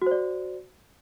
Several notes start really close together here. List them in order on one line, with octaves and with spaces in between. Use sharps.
F#4 C5 D5